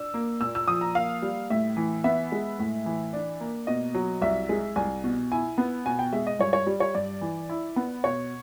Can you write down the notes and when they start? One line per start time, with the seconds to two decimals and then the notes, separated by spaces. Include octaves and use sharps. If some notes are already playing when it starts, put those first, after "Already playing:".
Already playing: D4 E6
0.14 A#3
0.41 A#2 E6
0.55 E6
0.68 F3 D#6
0.81 A#5
0.95 A#3 F5
1.22 G3
1.50 A2 E5
1.77 E3
2.04 B3 E5
2.32 G#3
2.59 A2
2.86 E3
3.13 D4
3.40 A#3
3.67 B2 D#5
3.94 F#3
4.22 C2 E5
4.49 G#3
4.76 C2 G#5
5.04 B2
5.32 E4 G#5
5.58 B3
5.86 B2 G#5
5.99 G5
6.13 G#3 E5
6.27 D#5
6.39 G2 C#5
6.53 C#5
6.67 G3
6.80 C#5
6.95 G2 D5
7.21 E3
7.49 E4
7.76 B3
8.04 B2 C#5